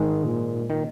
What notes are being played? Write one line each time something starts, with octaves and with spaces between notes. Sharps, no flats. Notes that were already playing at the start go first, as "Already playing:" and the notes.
Already playing: G#2 D#3 G#3
A#2
D#3